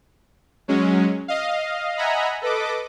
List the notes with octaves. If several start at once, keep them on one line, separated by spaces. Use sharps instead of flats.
F#3 G#3 C#4
D#5 F5
D#5 E5 F#5 G#5 A#5 B5
A4 B4 D#5 D6